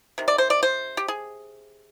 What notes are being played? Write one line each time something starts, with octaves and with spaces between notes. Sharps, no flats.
C3 D#3
D5
C5
D5
C5
G4
G#4